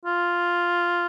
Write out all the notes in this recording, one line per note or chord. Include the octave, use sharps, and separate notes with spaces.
F4